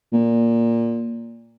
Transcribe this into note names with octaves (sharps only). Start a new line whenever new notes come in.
A#2